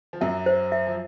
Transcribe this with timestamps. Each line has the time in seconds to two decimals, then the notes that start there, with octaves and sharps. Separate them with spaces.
0.13 F3
0.21 F#2 F#3 E5
0.46 C5
0.72 E5
0.87 F3